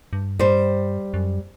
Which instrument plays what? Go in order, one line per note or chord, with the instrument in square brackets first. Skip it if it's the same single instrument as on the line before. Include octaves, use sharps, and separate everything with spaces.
[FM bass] G2
[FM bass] G2 [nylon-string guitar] G3 C5
[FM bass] F#2